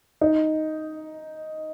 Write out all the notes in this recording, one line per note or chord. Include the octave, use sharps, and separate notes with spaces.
D#4